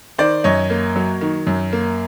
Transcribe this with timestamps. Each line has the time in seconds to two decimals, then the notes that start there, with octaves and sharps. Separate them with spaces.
0.18 D#3 C5 D5
0.44 F#2 C#5 D#5
0.70 A#3
0.96 F#3
1.21 D#3
1.47 F#2
1.73 A#3